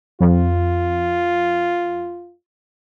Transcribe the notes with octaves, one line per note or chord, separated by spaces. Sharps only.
F2 F4